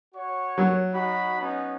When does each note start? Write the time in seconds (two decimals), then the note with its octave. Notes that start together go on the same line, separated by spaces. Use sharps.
0.15 F#4 C#5 C#6
0.58 F#3
0.93 D#4 F#4 B5
1.40 B3 C#4 D#4